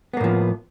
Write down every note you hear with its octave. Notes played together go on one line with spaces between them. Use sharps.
A2 F3 A#3 B3